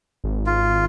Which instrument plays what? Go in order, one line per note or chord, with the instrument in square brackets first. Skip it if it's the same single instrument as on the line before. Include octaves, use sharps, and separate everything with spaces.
[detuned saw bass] G#1
[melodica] F4